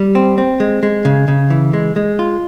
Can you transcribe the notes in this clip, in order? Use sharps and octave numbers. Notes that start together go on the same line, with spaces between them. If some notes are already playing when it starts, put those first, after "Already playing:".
Already playing: G3
C4
C4
G#3
G#3
C#3
C#3
E3
G#3
G#3
F4